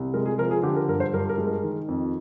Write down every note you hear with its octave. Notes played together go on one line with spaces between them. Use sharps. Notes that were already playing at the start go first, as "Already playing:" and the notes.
Already playing: C2
G#3 A#4
G#4
F3 A#4
G#4
D3 G4
A#4
G2 A#4
C5
G2 A#4
A#4
G#3
A#4
D#3
F2